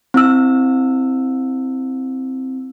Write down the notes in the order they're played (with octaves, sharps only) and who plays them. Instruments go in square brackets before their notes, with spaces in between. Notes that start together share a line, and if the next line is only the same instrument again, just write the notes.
[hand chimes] C4 E4 E6